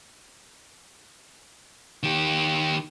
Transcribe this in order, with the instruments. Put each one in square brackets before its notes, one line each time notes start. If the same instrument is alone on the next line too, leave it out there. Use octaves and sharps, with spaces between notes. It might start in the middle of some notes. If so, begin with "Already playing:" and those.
[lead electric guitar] D#3 G4